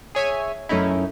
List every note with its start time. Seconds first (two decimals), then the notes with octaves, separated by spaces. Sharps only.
0.15 G#4 C#5 E5 G#5
0.69 F#2 A3 C#4 D#4 E4